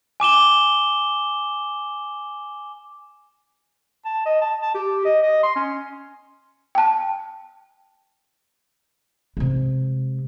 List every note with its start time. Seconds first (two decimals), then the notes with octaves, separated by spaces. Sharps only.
0.20 G#5 D6 E7 G7
4.05 A5
4.26 D#5
4.42 A5
4.62 A5
4.74 G4
5.05 D#5
5.22 D#5
5.43 C6
5.56 C#4
6.75 G5 A5
9.37 C3 G#3